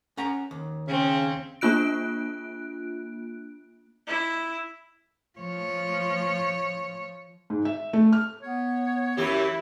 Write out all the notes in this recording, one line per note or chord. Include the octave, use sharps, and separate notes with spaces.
C#4 F#5 A#5
D#2
C#3 C4 C#4
A#3 D4 F4 F#6 D7
E4
F3 C#5
G#2
E5
A3
F6
B3 C#5
F#2 E3 E4 G4